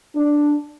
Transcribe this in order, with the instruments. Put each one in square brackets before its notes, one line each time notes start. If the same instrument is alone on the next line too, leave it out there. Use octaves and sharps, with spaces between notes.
[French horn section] D4